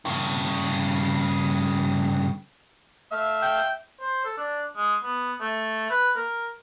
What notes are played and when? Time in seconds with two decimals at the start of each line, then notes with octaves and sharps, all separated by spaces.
0.05 G2 C#3
3.11 A3 E5 F5
3.42 G5
4.00 C5
4.25 A4
4.38 D4
4.76 G#3
5.03 B3
5.40 A3
5.90 B4
6.15 A#4